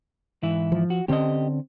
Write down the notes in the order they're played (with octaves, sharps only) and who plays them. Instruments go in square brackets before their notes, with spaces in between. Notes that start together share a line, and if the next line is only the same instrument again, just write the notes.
[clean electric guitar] G#2 E3 E4
[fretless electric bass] F3
[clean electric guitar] F#4
[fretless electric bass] D3 C4 C#4 [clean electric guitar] G4 D#5